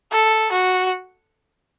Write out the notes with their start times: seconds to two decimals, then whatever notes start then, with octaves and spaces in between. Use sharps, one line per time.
0.12 A4
0.52 F#4